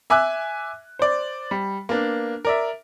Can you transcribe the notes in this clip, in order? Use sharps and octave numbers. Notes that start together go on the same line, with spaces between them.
E5 G#5 D6 E6 F#6
C5 D5
G3
A#3 B3 D4
A#4 D5 E5